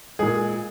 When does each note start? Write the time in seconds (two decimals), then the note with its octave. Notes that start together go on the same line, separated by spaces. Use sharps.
0.19 A#2 G#3 G#4